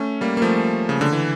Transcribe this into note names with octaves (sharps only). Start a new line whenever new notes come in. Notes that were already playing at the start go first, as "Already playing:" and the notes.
Already playing: A3 C#4
G3 A#3
A#3
F3 A3
C#3
D3
E3